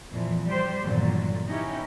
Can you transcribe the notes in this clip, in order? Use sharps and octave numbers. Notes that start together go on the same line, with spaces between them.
F2 A#2 E3 F3
G3 G4 C5
E2 G2 A#2 D3 D#3 F#3
B3 C#4 D#4 E4 G4